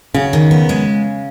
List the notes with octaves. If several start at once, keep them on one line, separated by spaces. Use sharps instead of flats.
C#3 F#4
D#3
B3
G#3